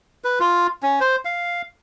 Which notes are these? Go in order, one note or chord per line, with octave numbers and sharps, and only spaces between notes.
B4
F4
C#4
C5
F5